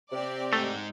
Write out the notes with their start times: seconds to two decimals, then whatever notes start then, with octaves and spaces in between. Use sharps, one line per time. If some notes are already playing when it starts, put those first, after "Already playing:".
0.12 C3 C4 G4 D5
0.53 G#2 A3 D#4